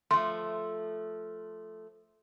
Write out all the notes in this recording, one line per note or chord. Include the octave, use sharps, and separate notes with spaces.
F3 A3 C6